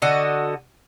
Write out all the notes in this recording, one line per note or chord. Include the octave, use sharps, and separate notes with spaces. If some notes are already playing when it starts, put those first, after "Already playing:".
D3 F#4 D#5